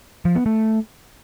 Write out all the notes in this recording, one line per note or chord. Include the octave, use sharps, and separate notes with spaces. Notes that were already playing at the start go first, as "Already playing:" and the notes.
F3
B3
A3